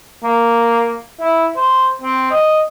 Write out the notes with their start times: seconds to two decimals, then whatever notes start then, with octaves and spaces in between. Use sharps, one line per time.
0.23 A#3
1.20 E4
1.57 C5
2.02 C4
2.30 D#5